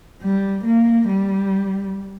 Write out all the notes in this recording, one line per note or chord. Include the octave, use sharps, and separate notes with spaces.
G3
A#3
G3